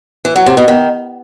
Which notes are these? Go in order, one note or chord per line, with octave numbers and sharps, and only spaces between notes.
E3
F#3
C3
B2
D#3